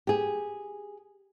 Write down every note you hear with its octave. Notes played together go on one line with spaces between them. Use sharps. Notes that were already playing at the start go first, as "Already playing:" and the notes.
G4 G#4